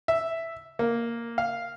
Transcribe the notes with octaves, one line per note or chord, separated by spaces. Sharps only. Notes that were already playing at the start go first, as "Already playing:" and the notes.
E5
A#3
F5